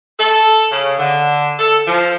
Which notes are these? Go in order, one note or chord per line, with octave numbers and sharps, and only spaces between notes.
A4
C#3
D3
A4
F3